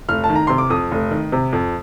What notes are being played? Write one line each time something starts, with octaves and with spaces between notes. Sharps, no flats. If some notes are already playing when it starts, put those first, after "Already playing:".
F1 F6
A5
D#3
A#5
C3 C6
D6
F2 D#6
F1
D#3
C3
F2